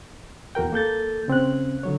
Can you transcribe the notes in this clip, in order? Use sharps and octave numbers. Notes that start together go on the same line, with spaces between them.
E2 F#4 A#4 G5
A#3 A4 G6 A6
C#3 C4 C#4 F#6
D3 F#3 C#5